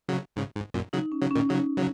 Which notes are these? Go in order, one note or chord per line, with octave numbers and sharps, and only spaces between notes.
C#3 F#3
G#2 C#3
G#2
F#2 A#2
C#3 F#3 D#4
C#4
C#3 F#3
C#4
A#2 D#3
C#3 F#3 D#4
C#3 F#3